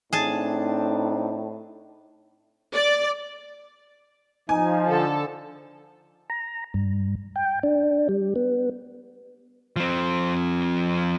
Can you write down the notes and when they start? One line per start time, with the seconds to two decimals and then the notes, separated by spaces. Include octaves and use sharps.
0.13 A2 C4 D4 D#4 G#4 A5
2.73 D5
4.49 F3 D#4 G#5
4.87 D3 A4
6.30 A#5
6.74 G2
7.36 G5
7.63 D4
8.09 G3
8.36 B3
9.76 F3 C4